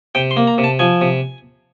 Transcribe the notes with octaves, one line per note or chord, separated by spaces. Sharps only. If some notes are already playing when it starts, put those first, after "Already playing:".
C3 G5
C6
A#3
A#5
C3
A5
F3 G#5
C3